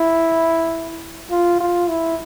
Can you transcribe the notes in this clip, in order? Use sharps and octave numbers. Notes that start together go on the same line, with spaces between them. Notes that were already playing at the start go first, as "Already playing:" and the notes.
Already playing: E4
F4
F4
E4